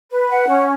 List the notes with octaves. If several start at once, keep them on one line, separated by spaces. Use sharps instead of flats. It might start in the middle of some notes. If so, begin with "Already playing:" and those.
B4
F#5
C#4